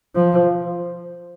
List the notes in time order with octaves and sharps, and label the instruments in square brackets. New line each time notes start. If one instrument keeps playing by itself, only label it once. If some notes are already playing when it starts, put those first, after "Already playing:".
[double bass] F3